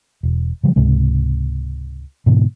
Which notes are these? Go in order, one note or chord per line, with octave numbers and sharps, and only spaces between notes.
E1
C#3 F3 G3
C#2 G#2 C3 G#3
G#2 B2 D3 E3